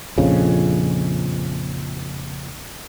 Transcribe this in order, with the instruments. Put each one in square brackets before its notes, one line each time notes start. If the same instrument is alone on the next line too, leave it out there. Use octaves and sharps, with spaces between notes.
[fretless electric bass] A#1 F2 C#3